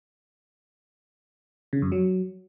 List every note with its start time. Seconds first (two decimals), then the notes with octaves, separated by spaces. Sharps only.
1.73 C#3
1.82 F#2
1.92 F#3